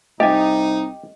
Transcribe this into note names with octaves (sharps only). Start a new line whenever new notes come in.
C2 D#4 G4 D#5 G#5